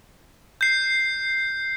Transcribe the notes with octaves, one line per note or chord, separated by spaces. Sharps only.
G6 C7